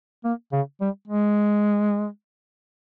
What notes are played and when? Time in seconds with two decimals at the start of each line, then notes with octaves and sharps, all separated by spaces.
0.25 A#3
0.52 C#3
0.81 G3
1.08 G#3